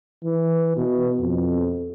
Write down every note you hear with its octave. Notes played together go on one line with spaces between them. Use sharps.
E3
B2
F2